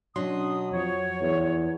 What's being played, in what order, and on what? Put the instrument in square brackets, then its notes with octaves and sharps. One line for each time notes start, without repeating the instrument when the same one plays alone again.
[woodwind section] B2 D#6 [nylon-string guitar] F#3 [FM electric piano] C#4 D4 C6
[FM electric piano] F2 F3 [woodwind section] C#5
[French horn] E2